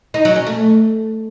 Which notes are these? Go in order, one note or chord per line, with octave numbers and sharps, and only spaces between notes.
D#4
F#3
C#4
A3